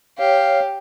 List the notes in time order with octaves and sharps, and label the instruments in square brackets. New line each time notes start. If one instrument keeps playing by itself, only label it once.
[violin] G4 [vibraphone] C#5 [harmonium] F5